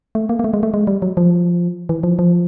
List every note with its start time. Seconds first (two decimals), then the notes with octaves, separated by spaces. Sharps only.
0.15 A3
0.29 A#3
0.39 A#3
0.44 A3
0.54 G#3
0.63 A3
0.74 G#3
0.87 G3
1.02 F#3
1.17 F3
1.89 E3
2.03 F3
2.19 F3